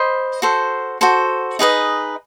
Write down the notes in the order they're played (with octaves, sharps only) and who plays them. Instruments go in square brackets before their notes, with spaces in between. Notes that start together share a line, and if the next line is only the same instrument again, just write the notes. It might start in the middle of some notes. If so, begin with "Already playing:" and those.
Already playing: [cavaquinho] C5 D#5 B5
F#4 A4 C5
F#4 A4 C5
D#4 G#4 B4 D#5